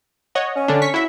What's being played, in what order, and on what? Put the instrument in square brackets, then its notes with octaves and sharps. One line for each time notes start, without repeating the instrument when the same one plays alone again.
[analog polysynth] C#5 D#5 F#5
[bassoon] C#4
[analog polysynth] D3 D4
C#6 B6
E4 F#4 E5